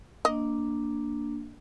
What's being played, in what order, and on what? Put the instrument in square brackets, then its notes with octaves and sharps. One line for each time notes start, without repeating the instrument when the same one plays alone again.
[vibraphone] A#3 D4 [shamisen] D#5